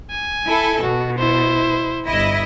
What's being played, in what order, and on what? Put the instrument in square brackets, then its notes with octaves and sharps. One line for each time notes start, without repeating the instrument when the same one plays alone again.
[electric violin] G#5
[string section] E4 A4
[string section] B2 [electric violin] F#4
[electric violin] E4 C5
[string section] G1 E4 D#5